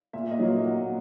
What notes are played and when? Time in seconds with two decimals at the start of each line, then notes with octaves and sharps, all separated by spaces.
0.13 A#2 E5
0.31 D#5
0.39 F#3 A#3
0.65 A#2 F#5